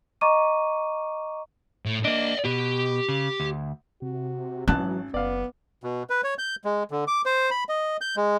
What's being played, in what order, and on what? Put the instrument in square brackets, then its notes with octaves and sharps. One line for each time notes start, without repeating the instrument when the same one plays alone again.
[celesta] D#5 A#5 C#6 D6 D#7
[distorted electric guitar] A2
[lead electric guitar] A#3 D4 [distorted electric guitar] D5 D#5
[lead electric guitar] B2 [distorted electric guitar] G4
[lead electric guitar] C#3
D2
[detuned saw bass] C3 [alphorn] F#4
[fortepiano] G#1 A5 F#6 [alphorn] E3 [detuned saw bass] F#3 [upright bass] C#4
[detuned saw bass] F#1 [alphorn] B3 [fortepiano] D5 F5
[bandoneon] B2
B4
C#5
G6
G#3
D3
D6
C5
B5
D#5
G6
G#3